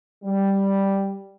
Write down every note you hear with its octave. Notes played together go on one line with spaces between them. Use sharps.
G3